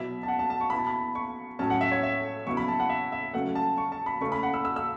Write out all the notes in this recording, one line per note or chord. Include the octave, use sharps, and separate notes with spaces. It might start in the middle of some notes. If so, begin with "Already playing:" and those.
Already playing: B2 F#3 B3 E4 E5
A5
F#5
A5
A5
C#6
B2 B3 E4 B5
A5
B5
C#6
A2 F#3 C#4 A5
F#5
E5
C#5
E5
C#3 F#3 B3 E4 C#6
B5
A5
F#5
E5
E5
C#3 F#3 A3 C#4 F#5
A5
C#6
A5
B5
C#3 A3 C#4 E4 C#6
B5
F#5
E6
E6
E6